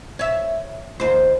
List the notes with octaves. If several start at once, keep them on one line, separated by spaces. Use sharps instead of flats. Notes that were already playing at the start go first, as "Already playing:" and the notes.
C#5 E5
D#2 C5